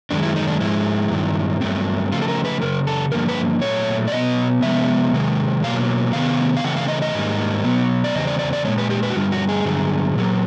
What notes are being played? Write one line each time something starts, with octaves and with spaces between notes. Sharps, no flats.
F#2 D#3 G#3 D4
E4
D#4
D4
G#2 F3 G#3 E4
G2 D#3 F#3
G2 D#3 F#3 A3 C4
C#3 F3 A3 F4
A4
A#4
B4
F#2 C#3 A#4
A4
G2 D3 F3 A#3 A#4
B4
A#2 F#3 A3 C#5
D5
B2 F#3 B3 D#5
C3 F3 G#3 B3 E5
C3 D#3 G#3
B2 F#3 A#3 F5
C3 D#3 B3 F5
F5
C#3 E3 A3 C4 F#5
F5
D#5
D#5
G#2 D#3 G3 A#3
B2 F#3 B3
D5
E2 C#3 C4 D#5
D5
D5
D5
A#2 F3 G#3 C#5
B4
G4
B4
F#4
G2 D3 G3 F4
F#4
G#4
G2 D3 F#3
A#2 F#3 A#3